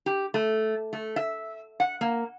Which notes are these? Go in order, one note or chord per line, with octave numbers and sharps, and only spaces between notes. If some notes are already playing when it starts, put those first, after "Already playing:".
G4
A3
A3
E5
F#5
A#3